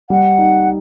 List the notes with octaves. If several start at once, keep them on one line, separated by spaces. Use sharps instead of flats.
G3 F#5
D#4